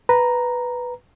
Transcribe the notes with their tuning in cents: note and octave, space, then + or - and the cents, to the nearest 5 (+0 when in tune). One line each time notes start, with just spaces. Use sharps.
B4 +0 A#5 +0